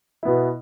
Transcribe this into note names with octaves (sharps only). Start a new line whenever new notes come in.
B2 B3 E4